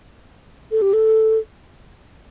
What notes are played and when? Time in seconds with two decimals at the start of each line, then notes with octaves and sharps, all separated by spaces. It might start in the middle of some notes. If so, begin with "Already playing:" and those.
0.71 A4
0.82 G4
0.93 A4